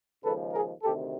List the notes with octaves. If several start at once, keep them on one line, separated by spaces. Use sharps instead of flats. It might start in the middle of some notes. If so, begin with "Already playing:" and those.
D#2 C#3 F3 G#3 A4 B4
G#4 A#4
D2 C3 D#3 G4 A4